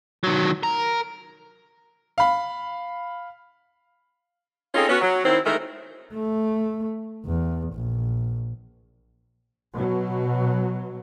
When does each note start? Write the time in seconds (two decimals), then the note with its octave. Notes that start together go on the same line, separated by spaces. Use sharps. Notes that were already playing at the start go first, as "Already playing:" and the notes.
0.24 D#3 F#3
0.63 A#4
2.18 F5 B5
4.75 C4 C#4 D#4 F4 G#4 A4
4.89 B3 C#4 F#4
5.01 F#3
5.25 D#3 C4 E4
5.46 D#3 E3 G#3 A3 A#4
6.13 A3
7.26 E2
7.74 A#1
9.74 B2 F#3